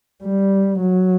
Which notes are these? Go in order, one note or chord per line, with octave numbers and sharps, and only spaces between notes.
G3
F#3